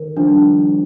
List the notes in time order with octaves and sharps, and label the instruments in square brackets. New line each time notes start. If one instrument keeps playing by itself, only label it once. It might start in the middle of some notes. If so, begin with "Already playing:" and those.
Already playing: [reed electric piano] D#3 [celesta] A#4
[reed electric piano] F3 [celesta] D4
[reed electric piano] G3